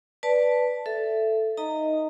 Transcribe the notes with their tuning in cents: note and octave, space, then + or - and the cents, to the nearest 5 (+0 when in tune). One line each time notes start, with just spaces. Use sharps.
B4 +0 D5 +0 A5 +0
A4 +0 E5 +15
D#4 +0 D#5 +0 A#5 -20